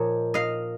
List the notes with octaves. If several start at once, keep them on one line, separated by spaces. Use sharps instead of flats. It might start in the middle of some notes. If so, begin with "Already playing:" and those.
Already playing: A#2 F3 C#5 D#5
D#5 F5